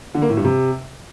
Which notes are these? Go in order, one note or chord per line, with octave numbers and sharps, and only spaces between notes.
D3
A#3
A2
G2
C3